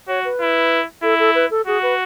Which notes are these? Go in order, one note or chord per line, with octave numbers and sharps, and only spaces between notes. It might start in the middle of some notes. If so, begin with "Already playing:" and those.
F#4 C#5
B4
E4
E4 A4
A4
B4
A4
F#4 G#4
B4